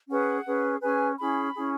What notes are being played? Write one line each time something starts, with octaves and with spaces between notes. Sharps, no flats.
C#4 G#4 B4 F#5
C#4 G#4 B4
C#4 G#4 B4 G#5
C#4 E4 G#4 B5
C#4 E4 G#4